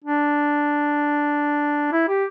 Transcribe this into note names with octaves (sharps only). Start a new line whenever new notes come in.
D4
E4
G4